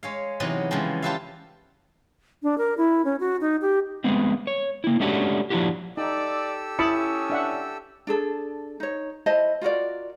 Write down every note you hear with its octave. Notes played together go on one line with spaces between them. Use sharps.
G#3 C#5 F5
C3 E3 F#3 B3 D#4 B4
C#3 E3 F3 G3 G#3
F4 G4 A4 B4 E5 F5
D4
A#4
E4
C#4
F#4
D#4
G4
G#3 B3 C4
C#5
A#3 E4
G#3 A3 C#4 D4 F#4 G4
F3 D4 E4 F#4 G4
D#4 G4 A4 D5 E6
C#4 E4 A5 B5 D6 D#6 C#7
D4 E5 F#5
D4 G#4 A4
D#4 C#5
E4 C5 D#5 A5
F4 F#4 A#4 D5